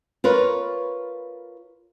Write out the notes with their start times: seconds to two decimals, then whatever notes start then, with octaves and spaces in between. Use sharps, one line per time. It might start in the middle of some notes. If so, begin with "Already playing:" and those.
0.24 F4 A#4 B4 C#5